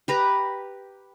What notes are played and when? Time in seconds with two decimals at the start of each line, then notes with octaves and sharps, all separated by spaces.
0.08 G4 B4 A#5